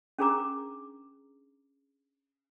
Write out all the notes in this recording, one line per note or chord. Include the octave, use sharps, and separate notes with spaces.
C#4 D4 G#4 A#4 A#5 D6